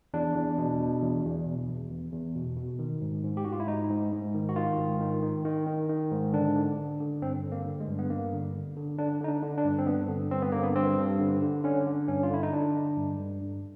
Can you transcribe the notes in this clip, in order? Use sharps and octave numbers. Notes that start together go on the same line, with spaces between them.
E2 D4
E2
B2
B2
E2
E2
B2
E2
E2
E2
B2
B2
D#3
G#2
G#2
G4
G#2 F#4
F4
E4
G#2 D#4
G#2
G#2
D#3
F#4
D#3 F4
G#2
D#3
D#3
D#3
D#3
D#3
G#2
D3 D4
D3
D3
D3
G2 C4
D3
A#3
D3
G#3
G2
B3
G2 A#3
D3
D3
D3
D3 D4
D3 D#4
D4
D3
D4
G2
C4
G2 B3
D3
G2 C4
B3
D3 A#3
B3
G2 C4
G2
D3
D3
D3 C#4
D3
G2 C#4
F4
D3 E4
D#4
D3 D4
D3
G2
G2
G2